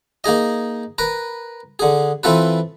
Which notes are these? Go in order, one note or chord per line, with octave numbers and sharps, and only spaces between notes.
A#3 D#4 G#4 D#5
A#4 B4
D3 G#4
E3 C4 F4 A4 B4